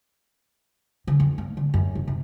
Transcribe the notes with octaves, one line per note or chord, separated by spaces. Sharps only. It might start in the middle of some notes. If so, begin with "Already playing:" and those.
D3
F2
G2
D3
F#2
F1
C3